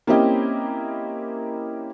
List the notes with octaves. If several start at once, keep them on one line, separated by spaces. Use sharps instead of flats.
A#3 C4 C#4 E4 G4 D#5